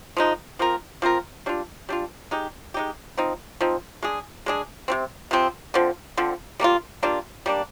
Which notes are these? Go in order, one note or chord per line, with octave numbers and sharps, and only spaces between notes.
F3 G#3 D#4
F3 C4 F4 A#4
F3 C4 F4 A#4
G3 D4 F4
G3 D4 F4
G#3 D#4 G4
G#3 D#4 G4
F3 C4 D#4
F3 C4 D#4
G#3 D4 G#4
G#3 D4 G#4
C3 F3 C4
C3 F3 C4
D3 F3 C4
D3 F3 C4
G3 A#3 D4 F4
G3 A#3 D4 F4
G3 A#3 D4